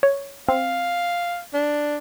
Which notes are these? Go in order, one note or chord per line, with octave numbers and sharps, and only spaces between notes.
C#5
C4 F5
D4